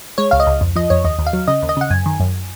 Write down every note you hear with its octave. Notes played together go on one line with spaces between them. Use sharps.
G#3 C#5
C#2 F5
D#5
C#2
F2
F3 D#5
F2 C#5
D#2 D#5
D#2
F5
F#3
C#3 D#5
D#2
D#5
C#3 F#5
F#2 G#5
D#3
F#2